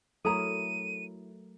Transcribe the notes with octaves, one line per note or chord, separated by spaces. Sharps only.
F#3 A3 E4 A4 A#4 C#5 A#5 D#7